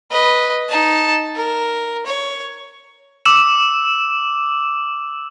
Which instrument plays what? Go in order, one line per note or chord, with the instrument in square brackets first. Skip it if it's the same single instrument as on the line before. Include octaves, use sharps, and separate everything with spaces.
[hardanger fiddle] B4 D#5
D#4 A5
A#4
C#5
[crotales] D6 E6 E7